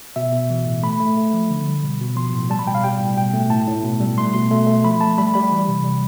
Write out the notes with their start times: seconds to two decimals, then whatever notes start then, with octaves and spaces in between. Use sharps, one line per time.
0.16 B2 E5
0.32 B2
0.50 E3
0.66 A2
0.83 A3 B5
1.00 A3
1.17 A3
1.33 F3
1.50 D3
1.67 G3
1.83 B2
2.01 B2
2.16 F3 C6
2.33 A2
2.50 G3 A5
2.59 B5
2.67 B2 G5
2.75 F5
2.84 G3 G5
3.00 A2
3.17 B2 G5
3.33 A3
3.50 A2 A5
3.67 A2
3.83 B2
4.00 G3
4.18 A3 C6
4.34 B2 C6
4.51 A3
4.67 A3
4.84 F3 B5
5.00 A3 A5
5.18 G3 B5
5.34 G3 B5
5.51 E3
5.68 C3
5.84 G3